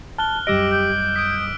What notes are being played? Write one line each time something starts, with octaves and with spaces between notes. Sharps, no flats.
A5 F6 F#6 G7
F#2 G3 G4 D#5 D6 E6 A#6 D7
G6
D#6 B6 D7